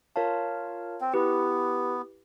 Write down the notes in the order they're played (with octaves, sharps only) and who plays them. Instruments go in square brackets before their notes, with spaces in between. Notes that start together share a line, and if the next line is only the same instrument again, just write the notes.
[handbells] F4 A#4 C#5 F5 A5
[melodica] C4
[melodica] B3 [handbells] E4 G4 B4